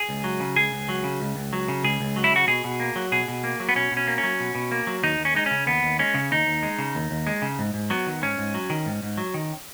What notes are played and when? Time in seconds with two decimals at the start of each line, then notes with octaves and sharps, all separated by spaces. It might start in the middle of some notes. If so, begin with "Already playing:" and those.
Already playing: G#4
0.09 C#2
0.24 F#3
0.40 C#3
0.56 C#2 G#4
0.72 C#2
0.89 F#3
1.04 C#3
1.20 C#2
1.36 C#2
1.53 F#3
1.68 C#3
1.84 C#2 G#4
2.01 C#2
2.16 F#3
2.24 E4
2.32 C#3 F#4
2.47 B2 G#4
2.64 B2
2.80 A#3
2.96 F#3
3.12 B2 G#4
3.28 B2
3.44 A#3
3.60 F#3
3.69 B3
3.76 B2 C#4
3.92 B2
3.97 C#4
4.07 A#3
4.18 C#4
4.23 F#3
4.40 B2
4.55 B2
4.71 A#3
4.87 F#3
5.03 D#2 D#4
5.19 D#2
5.25 C#4
5.35 G#3 D#4
5.46 C#3 C#4
5.66 D#2 B3
5.83 D#2
5.99 G#3 C#4
6.14 C#3
6.31 D#2 D#4
6.47 D#2
6.63 G#3
6.79 C#3
6.95 D#2
7.11 D#2
7.27 G#3
7.42 C#3
7.59 G#2
7.74 G#2
7.90 F#3 B3
8.07 D#3
8.22 G#2 C#4
8.38 G#2
8.54 F#3
8.70 D#3
8.86 G#2
9.03 G#2
9.17 F#3
9.34 D#3